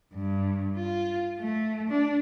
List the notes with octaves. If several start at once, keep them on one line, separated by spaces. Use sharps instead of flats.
G2
F4
A3
D4